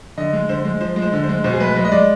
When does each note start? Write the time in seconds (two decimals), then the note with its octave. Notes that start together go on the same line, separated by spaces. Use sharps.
0.18 D3 D#5
0.33 G#3
0.49 D3 C5
0.65 G#3
0.81 F3 C5
0.96 G#3
1.02 C5
1.13 D3
1.24 C5
1.29 G#3
1.44 B2 C5
1.53 G#4
1.60 G#3 B4
1.75 G#3 B4
1.85 D#5
1.91 G#3 D5